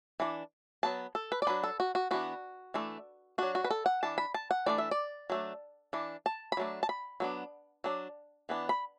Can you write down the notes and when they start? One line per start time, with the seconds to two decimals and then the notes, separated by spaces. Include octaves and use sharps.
0.20 E3 D4
0.83 F#3 B3 A5
1.15 A4
1.32 B4
1.42 D5
1.47 F#3 D4 B4
1.64 A4
1.80 F#4
1.95 F#4
2.11 E3 B3 D4 F#4
2.74 E3 A3 D4
3.38 F#3 D4 F#4
3.55 F#4
3.64 B4
3.70 A4
3.86 F#5
4.03 E3 D4 A5
4.18 B5
4.34 A5
4.51 F#5
4.66 E3 A3 D4 D5
4.78 E5
4.91 D5
5.30 F#3 A3 D4
5.93 E3 D4
6.26 A5
6.52 B5
6.57 F#3 A3 D4
6.83 A5
6.89 B5
7.20 F#3 B3 D4
7.84 F#3 D4
8.49 E3 B3 D4
8.69 B5